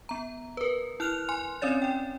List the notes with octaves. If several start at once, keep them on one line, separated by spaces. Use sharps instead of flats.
B3 A#5
A#4 B4
E4 F6 F#6 F7
G#5 C6
C4 C#4 C#5 D5 A6
D5 G5